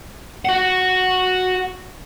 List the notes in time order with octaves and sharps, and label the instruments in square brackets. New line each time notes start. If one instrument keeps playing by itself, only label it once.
[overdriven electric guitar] F#4 F#5